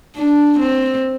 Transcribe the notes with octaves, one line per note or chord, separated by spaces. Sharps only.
D4
C4